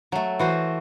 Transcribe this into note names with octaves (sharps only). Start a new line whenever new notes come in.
F#3 A3
E3 F#4 C5